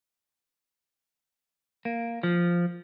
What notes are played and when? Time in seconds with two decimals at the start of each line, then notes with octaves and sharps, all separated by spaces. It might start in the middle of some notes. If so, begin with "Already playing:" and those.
1.85 A#3
2.23 F3